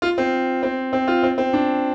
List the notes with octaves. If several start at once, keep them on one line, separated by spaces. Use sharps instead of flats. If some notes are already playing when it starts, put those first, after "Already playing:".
F4
C4
C4
C4
F4
C4
C4
D4